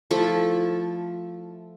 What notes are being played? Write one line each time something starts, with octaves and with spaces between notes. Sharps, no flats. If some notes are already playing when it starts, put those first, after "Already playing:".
F3 A3 E4 A4